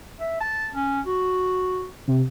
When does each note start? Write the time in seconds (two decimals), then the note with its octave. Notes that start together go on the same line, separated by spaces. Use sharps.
0.20 E5
0.41 A5
0.74 C#4
1.06 F#4
2.08 C3